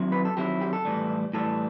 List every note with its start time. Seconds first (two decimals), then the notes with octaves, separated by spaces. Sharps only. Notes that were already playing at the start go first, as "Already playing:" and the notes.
Already playing: D#3 F#3 C4 E4
0.12 B4
0.25 A4
0.37 D#3 F#3 C4 E4 G4
0.61 G4
0.73 A4
0.85 A2 E3 G3
1.33 A2 E3 G3 A4